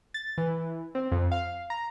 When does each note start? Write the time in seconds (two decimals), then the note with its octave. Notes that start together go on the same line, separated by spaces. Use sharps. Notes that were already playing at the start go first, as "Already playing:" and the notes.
0.14 A6
0.38 E3
0.95 C4
1.12 F2
1.32 F5
1.70 A#5